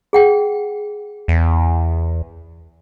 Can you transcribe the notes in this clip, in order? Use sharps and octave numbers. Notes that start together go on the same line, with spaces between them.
G#4 F#5 G5
E2